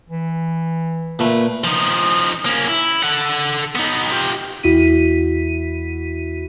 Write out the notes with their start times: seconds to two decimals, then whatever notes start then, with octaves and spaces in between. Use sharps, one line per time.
0.09 E3
1.19 A#2 A3 B4
1.64 F3 D#4
2.45 A#3 C#4
2.68 E4
3.03 A4 F#5
3.75 B3 D#4
4.12 F4 G4
4.63 E2 E4 F#4 B6 D#7